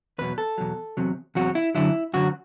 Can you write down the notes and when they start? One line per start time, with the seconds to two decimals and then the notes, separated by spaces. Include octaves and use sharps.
0.18 E2 B2 F#3 B4
0.38 A4
0.58 E2 B2 F#3
0.97 E2 C3 F#3
1.35 E2 C3 F#3 F#4
1.55 E4
1.75 F#2 D3 F#3 E4
2.13 F#2 D3 F#3 F#4